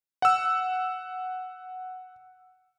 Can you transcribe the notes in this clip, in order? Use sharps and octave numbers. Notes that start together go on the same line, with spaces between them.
F#5 E6